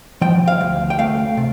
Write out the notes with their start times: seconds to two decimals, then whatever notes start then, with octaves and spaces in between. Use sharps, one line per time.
0.21 F3 G5
0.48 F5
0.61 D2
0.90 G5
0.99 A3 F5
1.37 C3